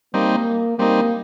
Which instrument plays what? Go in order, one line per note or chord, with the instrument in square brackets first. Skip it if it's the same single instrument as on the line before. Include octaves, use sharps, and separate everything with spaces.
[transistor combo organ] G3 C4 D#4 [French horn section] A#3
[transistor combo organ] G3 C4 D#4 [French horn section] A#3